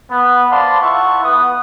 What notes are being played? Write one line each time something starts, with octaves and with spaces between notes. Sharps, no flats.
B3
C5 D5 F5 A5 B5 C6
E4 F4 A4 E5 F#5 C#6
B3 F#5 D#6